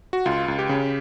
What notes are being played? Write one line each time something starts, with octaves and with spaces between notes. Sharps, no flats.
F#4
C#2 F4
C#2
G4
C#3